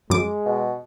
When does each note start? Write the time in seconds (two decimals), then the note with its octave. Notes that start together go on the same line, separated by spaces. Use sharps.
0.10 F#2 G#3 D6
0.46 B2